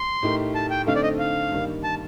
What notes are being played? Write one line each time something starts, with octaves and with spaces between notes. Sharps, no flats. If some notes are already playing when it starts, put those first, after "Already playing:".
Already playing: C6
A2 A3 D#4 G4 A#4
A5
G5
D3 A3 C4 D#4 A4 F5
D5
D#5
F5
G2 D#3 G3 A#3
A5